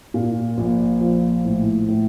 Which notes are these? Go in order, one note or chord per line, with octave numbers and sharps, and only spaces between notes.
A#2
A#1
F3
A2
A2